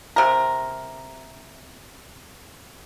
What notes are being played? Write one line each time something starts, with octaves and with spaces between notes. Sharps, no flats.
C3 A#4